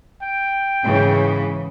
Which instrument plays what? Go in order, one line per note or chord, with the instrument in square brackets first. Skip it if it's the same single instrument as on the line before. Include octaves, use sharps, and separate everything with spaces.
[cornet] G5
[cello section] G#2 C#3 E3